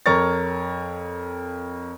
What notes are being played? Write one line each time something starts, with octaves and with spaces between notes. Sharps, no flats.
F2 A#4 C#5 C#6 A6